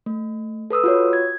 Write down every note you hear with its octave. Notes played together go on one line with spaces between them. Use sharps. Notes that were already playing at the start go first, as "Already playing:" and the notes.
A3
A4 B4 D#6 E6
F4 F#4 C#5
G#6